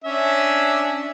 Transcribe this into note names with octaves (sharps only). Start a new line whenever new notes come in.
C#4 D4 E5